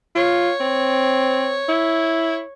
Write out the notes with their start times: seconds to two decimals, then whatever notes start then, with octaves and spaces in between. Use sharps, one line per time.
0.15 F4 C#5
0.60 C4
1.69 E4